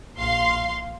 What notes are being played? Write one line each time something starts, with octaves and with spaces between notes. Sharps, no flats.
A#1 F5 C6